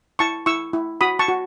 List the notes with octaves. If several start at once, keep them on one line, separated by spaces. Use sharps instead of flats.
E4 A5 C#6
E4 C#6 E6
E4
F#4 B5 D#6
A5 C#6
F#4